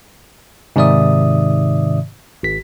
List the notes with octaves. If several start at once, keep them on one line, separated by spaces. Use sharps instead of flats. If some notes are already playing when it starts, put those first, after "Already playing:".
G#2 C3 D#3 D5 E5 D#6
G#1 B6